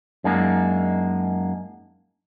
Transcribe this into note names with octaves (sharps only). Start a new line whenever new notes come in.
F#2 G#3 A#3 D4 D#4